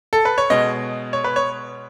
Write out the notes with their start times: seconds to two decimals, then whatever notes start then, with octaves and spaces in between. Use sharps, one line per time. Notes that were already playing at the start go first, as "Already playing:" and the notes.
0.13 A4
0.25 B4
0.38 C#5
0.50 B2 G#3 D#5
1.13 C#5
1.24 B4
1.36 C#5